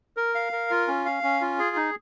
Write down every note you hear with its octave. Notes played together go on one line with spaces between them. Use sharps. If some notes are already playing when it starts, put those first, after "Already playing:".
A#4
F5
A#4
F4
C#4
F5
C#4
F4
G#4
D#4